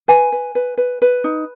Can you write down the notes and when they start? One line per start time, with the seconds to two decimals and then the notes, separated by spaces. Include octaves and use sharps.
0.08 B4 G#5
0.32 B4
0.55 B4
0.78 B4
1.02 B4
1.24 D#4